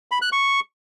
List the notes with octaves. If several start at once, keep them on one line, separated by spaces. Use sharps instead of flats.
B5
F#6
C#6